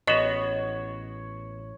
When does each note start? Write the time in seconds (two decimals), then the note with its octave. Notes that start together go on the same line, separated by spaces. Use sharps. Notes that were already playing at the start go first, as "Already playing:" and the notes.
0.07 A1 B3 F#4 C#5 D#5